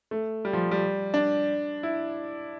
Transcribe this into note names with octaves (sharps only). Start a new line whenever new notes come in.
A3
G3
F3
G3
D4
E4